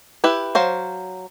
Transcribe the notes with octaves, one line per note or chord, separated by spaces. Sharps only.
E4 G4 B4
F#3 C5 F5